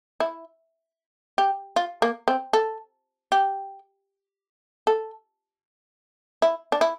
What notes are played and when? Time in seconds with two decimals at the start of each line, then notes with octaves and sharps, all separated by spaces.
0.20 E4
1.38 G4
1.76 F4
2.02 A#3
2.28 C4
2.53 A4
3.32 G4
4.87 A4
6.42 E4
6.72 D4
6.81 E4